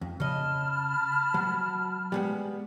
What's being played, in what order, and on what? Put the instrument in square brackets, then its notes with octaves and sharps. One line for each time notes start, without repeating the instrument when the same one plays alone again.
[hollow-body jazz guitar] F2
[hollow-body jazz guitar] C#3 D#5 [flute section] A5 B5 F6
[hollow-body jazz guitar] F#3
G3 G#3 B3